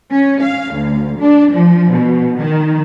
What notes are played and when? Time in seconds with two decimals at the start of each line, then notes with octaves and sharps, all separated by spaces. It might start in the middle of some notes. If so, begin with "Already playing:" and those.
0.12 C#4
0.45 F5
0.76 D2
1.20 D4
1.53 F3
1.92 B2
2.41 D#3